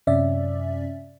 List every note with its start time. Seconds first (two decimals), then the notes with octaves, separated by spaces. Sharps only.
0.07 F#2 C3 C#4 D5 E5